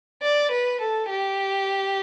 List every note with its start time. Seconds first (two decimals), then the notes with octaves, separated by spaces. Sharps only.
0.23 D5
0.51 B4
0.81 A4
1.10 G4